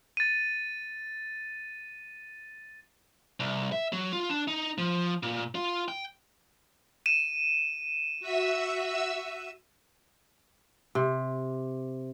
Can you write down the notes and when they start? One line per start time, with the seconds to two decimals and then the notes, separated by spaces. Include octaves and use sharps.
0.17 A6 D#7
3.40 C2
3.72 E5
3.93 F#3
4.13 F4
4.29 D4
4.48 D#4
4.78 F3
5.23 A#2
5.55 F4
5.88 G5
7.06 D#7 E7
8.20 F#4 E5 E6
10.95 C3